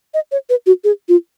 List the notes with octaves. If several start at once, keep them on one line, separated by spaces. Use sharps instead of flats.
D#5
C#5
B4
F#4
G#4
F4